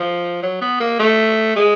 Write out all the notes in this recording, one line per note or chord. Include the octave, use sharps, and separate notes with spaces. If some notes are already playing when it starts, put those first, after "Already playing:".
Already playing: F3
F#3
B3
A#3
A3
G#3